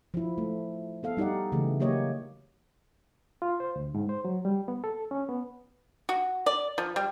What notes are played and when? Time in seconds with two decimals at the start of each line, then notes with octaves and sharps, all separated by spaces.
0.14 F3 E4
0.38 A3
1.03 B3 A4 F5
1.17 G3 D#4 G4 D5 F#5
1.52 C#3 E3 A3 G#4
1.80 F#3 A#3 G4 C#5 D#5
3.42 F4
3.60 C5
3.76 D2
3.95 G#2
4.09 C5
4.25 F#3
4.45 G3
4.68 B3
4.84 A4
5.11 C#4
5.29 B3
6.09 F#4
6.46 D5
6.78 F3
6.96 G3